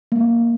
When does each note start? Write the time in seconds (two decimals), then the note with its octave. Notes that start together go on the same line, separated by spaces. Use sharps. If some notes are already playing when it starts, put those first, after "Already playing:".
0.12 A#3